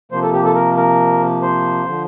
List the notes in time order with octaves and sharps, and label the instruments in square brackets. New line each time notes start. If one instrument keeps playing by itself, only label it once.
[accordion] C3 F3 A#3 C5
A4
G4
A4
A#4
A#4
C5
D3 F3